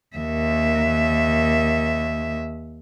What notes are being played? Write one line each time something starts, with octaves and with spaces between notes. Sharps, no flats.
D#2 E5